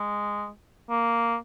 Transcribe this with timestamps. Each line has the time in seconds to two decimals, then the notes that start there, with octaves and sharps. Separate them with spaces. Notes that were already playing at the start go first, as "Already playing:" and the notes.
Already playing: G#3
0.89 A#3